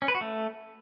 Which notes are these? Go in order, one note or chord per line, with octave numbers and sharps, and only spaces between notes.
C#4
B4
F#4
A3